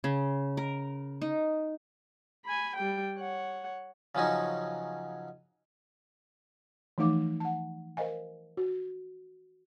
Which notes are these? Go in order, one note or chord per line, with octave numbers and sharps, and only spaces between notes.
C#3
A#4
D#4
G#5 B5
G3 G5
C#5 F#5
C#3 F3 F#3 C#4 D#4
E3 F3 A3 D#4 F5 D6
F#5 A5
A#4 C5 D#5 F5 G#5
F#4